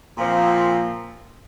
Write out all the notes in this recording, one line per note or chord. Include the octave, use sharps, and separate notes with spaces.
A#2 F3 C4